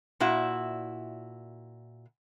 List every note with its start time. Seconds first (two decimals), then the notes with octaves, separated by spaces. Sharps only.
0.20 A#2 E4 F#4